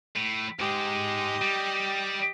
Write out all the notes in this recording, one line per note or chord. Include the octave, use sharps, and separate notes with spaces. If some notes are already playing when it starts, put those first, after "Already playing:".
A2
G#2 G#3 G4 D#5
G3